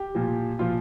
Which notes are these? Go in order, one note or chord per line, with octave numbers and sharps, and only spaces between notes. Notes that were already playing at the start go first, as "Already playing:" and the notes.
Already playing: G4
A#2 F3
A#2 F3 F4